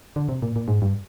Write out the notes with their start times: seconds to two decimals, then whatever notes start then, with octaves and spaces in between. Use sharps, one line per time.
0.16 D3
0.29 C3
0.42 A#2
0.56 A#2
0.68 G#2
0.82 G2